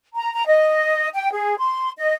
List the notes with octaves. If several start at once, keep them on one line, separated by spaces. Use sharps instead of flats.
A#5
A#5
D#5
G5
G#4
C6
D#5